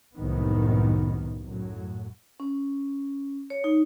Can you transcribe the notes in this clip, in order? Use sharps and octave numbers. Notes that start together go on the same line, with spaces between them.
C2 F#2 A2 D#3 B3
F#2 A2 F#3
C#4
C#5
D#4